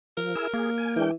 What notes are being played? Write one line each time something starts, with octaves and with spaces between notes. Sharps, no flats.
F3 A#4
E4 G#4 E6
A#3 G#4
G#5
E3 G#3 D4 G5